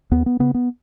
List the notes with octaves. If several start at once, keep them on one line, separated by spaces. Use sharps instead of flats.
D#2 B3
B3
C#3 B3
B3